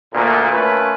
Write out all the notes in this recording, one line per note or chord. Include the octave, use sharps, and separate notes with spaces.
D2 A#2
A3 C#4 F4 A#4 B4